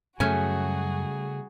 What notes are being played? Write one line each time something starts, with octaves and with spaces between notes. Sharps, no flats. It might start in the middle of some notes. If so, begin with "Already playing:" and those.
F#2 C#3 G3 A3 C#4 F#4 G#4 G#5